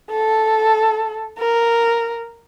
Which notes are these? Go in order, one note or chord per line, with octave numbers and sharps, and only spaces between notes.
A4
A#4